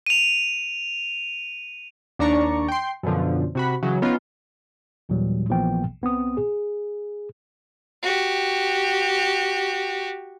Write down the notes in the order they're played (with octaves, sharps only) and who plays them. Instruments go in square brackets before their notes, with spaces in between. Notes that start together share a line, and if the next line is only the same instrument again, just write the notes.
[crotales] D#7 F7
[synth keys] D#2 D4 D5 A#5 C#6
G5 C6
F#2 B2 D3 F3
C3 F#4 B5
C#3 E3 F#3
B3 C#4 D#4 F4
[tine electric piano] D#2 A#2 E3 F#3 G3
A#1 E3 F3 A#3 B3 G5
C2 B3 C4 D#6
G#4
[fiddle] F#4 G4